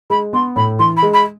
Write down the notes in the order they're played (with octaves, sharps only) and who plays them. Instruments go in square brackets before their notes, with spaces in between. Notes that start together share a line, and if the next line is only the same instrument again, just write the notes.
[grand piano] G#3 [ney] B5
[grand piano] B3 [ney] C6
[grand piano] A2 [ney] B5
[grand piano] E3 [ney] C6
[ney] B5
[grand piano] G#3
[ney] B5